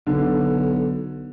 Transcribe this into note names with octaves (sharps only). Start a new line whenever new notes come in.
B1 D3